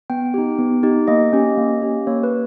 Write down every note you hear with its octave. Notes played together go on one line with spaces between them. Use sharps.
B3 G5
D#4 G4
B3
D#4 G4
A#3 D#5
C#4 G4
A#3
C#4 G4
A#3 C#5
B4